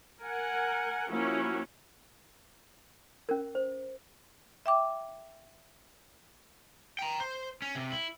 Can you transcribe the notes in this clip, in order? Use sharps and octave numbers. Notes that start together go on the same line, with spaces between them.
A#4 F#5 G#5
F3 A#3 C#4 E4 F#4
C#4 A#4
C5
E5 G5 D6
G5 A#5
C5
C#4
C3
E4